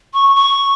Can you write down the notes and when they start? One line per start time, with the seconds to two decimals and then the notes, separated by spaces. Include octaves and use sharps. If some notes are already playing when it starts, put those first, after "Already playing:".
0.14 C#6
0.36 C#6